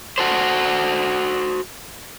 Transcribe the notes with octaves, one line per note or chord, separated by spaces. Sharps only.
F#4 A4 C5